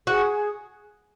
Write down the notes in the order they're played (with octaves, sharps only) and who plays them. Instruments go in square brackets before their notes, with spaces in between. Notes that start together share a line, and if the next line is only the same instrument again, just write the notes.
[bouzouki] F#4 [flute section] G#4